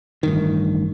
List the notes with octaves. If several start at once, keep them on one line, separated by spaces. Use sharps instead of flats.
A1 G2 D#3